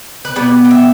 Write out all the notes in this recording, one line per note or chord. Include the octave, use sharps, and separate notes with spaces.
B4
B2 G3 B3 D5
G5
E5